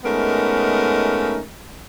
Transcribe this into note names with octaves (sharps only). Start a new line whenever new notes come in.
G#3 A3 B3 C#4 D#4 A#4